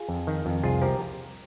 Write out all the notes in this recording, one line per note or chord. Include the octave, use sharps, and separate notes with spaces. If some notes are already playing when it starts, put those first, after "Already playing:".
Already playing: F4 G#4
F2
D#3
F2
C2 F4 G#4
F3 G4 A#4